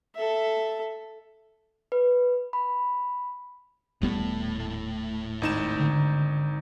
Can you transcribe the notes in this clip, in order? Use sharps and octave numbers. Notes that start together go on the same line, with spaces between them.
A4 E5
B4
B5
D#1 A2 G3 A3 B3
G#1 D#4 E7
D3